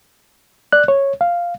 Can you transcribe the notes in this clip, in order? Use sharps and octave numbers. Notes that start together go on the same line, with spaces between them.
D5 F#6
C#5
F5